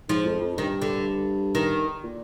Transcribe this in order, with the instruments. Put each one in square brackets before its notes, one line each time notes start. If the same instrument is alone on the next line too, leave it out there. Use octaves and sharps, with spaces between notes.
[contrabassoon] G#2 [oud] F3
[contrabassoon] F2
F2
[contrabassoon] G2 [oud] D#3
[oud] D3
D#3
[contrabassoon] A#2